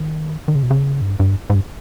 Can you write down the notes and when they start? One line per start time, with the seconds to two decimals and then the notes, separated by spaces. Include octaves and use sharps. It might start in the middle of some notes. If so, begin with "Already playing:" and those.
Already playing: D#3
0.48 D#3
0.55 C#3
0.63 B2
0.70 C#3
1.01 G2
1.20 G2
1.50 G#2
1.55 G2